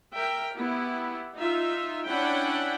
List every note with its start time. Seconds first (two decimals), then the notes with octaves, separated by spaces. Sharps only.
0.14 A#4 E5 G5
0.55 B3 E4 G4
1.35 D#4 F4 E5
2.06 C#4 D4 E4 F#5 G5 B5